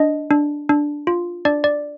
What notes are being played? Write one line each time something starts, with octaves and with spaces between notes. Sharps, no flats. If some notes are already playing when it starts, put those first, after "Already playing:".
Already playing: D4 D#5
D4
D4
F4
D4 D5
D5